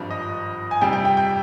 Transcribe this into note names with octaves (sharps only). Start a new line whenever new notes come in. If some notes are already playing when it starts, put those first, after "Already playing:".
Already playing: G#1 G2 F3
D#5
G#5
F2 C3 G3 G5
G5
G5
G5